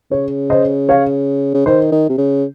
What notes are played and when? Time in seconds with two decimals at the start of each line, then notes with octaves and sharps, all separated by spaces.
0.11 C#3 C#5
0.50 C5 D#5
0.89 C#5 F5
1.54 C#3
1.66 D#3 C5
1.92 D#3
2.09 C3
2.17 C#3